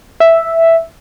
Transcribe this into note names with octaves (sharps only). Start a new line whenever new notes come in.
E5